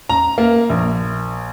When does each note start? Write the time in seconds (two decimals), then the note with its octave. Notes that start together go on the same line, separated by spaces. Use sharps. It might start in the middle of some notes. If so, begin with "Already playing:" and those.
0.09 A#5
0.38 A#3
0.70 A#1